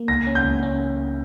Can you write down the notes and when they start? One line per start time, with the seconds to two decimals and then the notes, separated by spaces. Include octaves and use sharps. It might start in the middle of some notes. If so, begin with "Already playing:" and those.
Already playing: A#3
0.08 C#2 A#6
0.27 C#4
0.35 G6
0.44 C#2
0.63 C#4